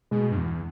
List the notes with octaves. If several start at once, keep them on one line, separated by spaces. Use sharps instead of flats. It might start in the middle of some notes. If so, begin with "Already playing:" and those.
B2 G#3
G2
E2